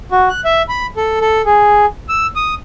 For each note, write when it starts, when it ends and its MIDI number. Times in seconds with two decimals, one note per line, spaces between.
0.12 0.29 66
0.29 0.41 90
0.45 0.62 76
0.69 0.86 83
0.97 1.19 69
1.21 1.42 69
1.46 1.86 68
2.09 2.27 88
2.36 2.54 87